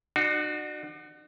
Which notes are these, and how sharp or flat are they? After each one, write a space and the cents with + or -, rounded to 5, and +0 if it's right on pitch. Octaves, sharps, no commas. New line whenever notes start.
D4 +45 F#4 -5